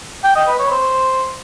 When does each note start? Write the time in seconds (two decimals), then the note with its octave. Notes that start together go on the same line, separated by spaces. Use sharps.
0.24 G5
0.35 D#5
0.47 B4
0.59 C#5
0.71 C5